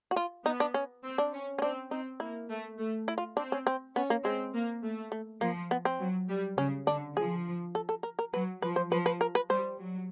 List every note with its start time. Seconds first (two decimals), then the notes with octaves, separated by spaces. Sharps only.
0.11 F#4
0.16 F4
0.45 B3 D#4
0.60 D4
0.74 C#4
1.03 C4
1.18 D4
1.33 C#4
1.58 C#4
1.62 C4 D4
1.91 C4 D#4
2.20 A#3 E4
2.50 A3
2.78 A3
3.08 E4
3.18 F4
3.37 C4 D4
3.52 C#4
3.67 C4
3.96 B3 C#4
4.10 A#3
4.24 G#3 C4
4.54 A#3
4.83 A3
5.12 A3
5.41 F3 A#3
5.71 B3
5.85 C4
5.99 F#3
6.29 G3
6.57 C#3 C#4
6.87 D3 D4
7.16 F3 G#4
7.75 A4
7.89 A4
8.03 A#4
8.19 A#4
8.33 F#3 B4
8.62 F3 B4
8.76 C5
8.91 F3 B4
9.06 B4
9.21 A#4
9.35 B4
9.50 G3 C5
9.79 F#3